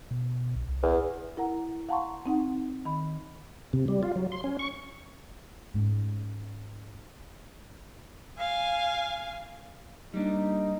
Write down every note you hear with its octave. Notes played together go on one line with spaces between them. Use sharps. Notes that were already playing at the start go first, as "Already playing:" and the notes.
B2
B1
C2
E2
E4 A#4 F#5 A#5
F5 F#5 A5 A#5 C6 C#6
C4 D#4 F#5
D#3 B5
C3
G3
F4
F#3
C6
C#4
C#6
G#2 C#4
F5 G#5
G3 A#3 D4 D#4